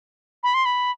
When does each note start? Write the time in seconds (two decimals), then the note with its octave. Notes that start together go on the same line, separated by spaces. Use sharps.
0.43 B5
0.54 C6
0.65 B5